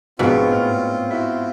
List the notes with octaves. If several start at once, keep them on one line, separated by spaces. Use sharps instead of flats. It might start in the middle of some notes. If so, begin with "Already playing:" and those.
A#1 G#2 B2 B3 C4 F4 G#4 E6
A2 F6
E4 F#4